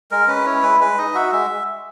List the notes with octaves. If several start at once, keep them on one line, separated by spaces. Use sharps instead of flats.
G#3 A#4
C#4 B4
E4 C#5
G#3 B4
G#3 B4
D#4 D#5
F#4 E5
G#3 E5